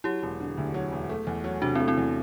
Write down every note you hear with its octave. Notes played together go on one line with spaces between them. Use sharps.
F#3 E4 G4
E1
D3
D2
F#3
E1
A3
E2
F#3
C3 D4 F#4
C4 E4
A3
C4 E4
E2